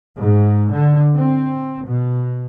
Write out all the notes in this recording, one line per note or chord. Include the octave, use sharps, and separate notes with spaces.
G#2
D3
C4
B2